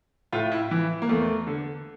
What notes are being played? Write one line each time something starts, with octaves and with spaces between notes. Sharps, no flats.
A2 F4
E4
E3
A#3
E2 A3
D3